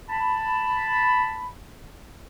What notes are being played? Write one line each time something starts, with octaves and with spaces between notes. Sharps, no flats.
A5 B5